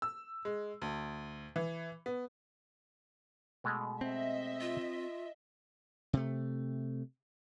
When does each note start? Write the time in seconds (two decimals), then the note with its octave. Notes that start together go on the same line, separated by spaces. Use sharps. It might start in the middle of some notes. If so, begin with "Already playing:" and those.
0.02 E6
0.45 G#3
0.82 D2
1.56 E3
2.06 B3
3.64 B2 G#3 A3
4.01 C4 D#5 E5
4.61 F4
6.13 C3 A3